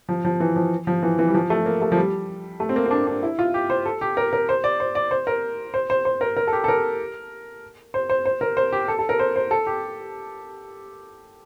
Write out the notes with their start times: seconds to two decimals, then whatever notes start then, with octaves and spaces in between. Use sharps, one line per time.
0.09 F3
0.25 F3
0.40 E3
0.56 F3
0.87 F3
1.03 E3
1.19 E3
1.27 G3
1.34 F3
1.50 A3
1.66 A#3
1.82 A3
1.92 F3
1.97 G3
2.60 A3
2.69 C4
2.76 A#3
2.85 C4
2.91 D4
3.07 D4
3.23 E4
3.39 F4
3.54 G4
3.70 C5
3.85 A4
4.01 G4
4.17 A#4
4.33 A#4
4.49 C5
4.64 D5
4.80 C5
4.95 D5
5.11 C5
5.27 A#4
5.74 C5
5.90 C5
6.05 C5
6.21 A#4
6.37 A#4
6.47 A4
6.53 G4
6.64 A4
6.68 A#4
7.94 C5
8.10 C5
8.26 C5
8.41 A#4
8.57 C5
8.72 G4
8.88 A4
8.99 A4
9.09 A#4
9.19 C5
9.36 C5
9.51 A4
9.67 G4